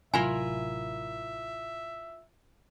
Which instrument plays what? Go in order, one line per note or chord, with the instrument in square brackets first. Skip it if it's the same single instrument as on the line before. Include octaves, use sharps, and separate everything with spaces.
[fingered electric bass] A1 C3 F#3 [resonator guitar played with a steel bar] E4 F4 A#4 [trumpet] E5 [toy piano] G#5